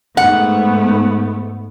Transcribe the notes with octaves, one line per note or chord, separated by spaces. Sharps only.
G#2 A3 B3 F#5